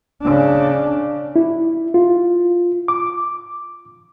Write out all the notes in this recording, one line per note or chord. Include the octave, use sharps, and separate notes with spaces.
C#3 D4
E4
F4
D6